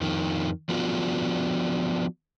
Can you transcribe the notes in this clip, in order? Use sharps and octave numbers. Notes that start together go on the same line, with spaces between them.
F2 D#3
F3 B3 D4 F4 F#4